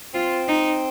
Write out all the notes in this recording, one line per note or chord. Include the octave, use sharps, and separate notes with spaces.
C4 F4
D#4